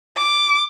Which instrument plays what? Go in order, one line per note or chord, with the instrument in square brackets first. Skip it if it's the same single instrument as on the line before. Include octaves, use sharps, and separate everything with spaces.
[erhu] D6